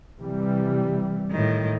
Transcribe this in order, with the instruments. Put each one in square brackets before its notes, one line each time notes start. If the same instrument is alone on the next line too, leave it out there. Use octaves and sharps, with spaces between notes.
[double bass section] C3 E3 G3
[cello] A2 D#3